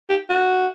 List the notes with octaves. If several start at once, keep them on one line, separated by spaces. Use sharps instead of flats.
G4
F#4